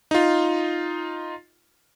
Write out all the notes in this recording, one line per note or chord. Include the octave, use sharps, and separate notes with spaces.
D#4 F4